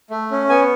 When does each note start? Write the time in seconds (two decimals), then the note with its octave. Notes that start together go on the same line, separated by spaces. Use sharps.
0.10 A3
0.31 C#4
0.49 B3 G#5